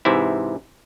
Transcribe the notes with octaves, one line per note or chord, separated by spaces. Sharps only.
G#2 C3 E3 E4